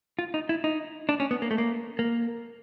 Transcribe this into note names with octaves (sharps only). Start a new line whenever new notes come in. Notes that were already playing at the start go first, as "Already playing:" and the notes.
F4
D#4
E4
D#4
D4
C#4
B3
A#3
A3
A#3
A#3